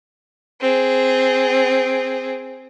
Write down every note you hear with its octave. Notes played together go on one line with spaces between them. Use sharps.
C4 G#4